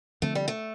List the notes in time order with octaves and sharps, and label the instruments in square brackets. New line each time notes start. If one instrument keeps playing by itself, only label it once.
[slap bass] D3 F3 C4 [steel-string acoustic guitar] A3
[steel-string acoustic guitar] G3
A3